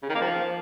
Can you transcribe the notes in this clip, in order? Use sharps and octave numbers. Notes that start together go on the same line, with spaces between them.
C#3
D#3
A#3
F3